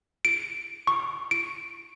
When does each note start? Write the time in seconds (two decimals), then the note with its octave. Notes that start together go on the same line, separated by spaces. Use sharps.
0.25 D7
0.87 C#6
1.31 D7